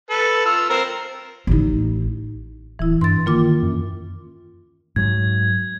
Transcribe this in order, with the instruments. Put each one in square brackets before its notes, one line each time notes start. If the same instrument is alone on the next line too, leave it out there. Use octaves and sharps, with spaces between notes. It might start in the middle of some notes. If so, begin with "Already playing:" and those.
[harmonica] A4 B4
F4 E6
C4 A#4
[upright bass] A1 D#4
[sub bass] D1 [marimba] E3 E4
[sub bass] G2 [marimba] C6 A6
[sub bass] D#3 [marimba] A#3 F4 D6
[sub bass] F#2
[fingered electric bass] G#2 F#3 [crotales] G#6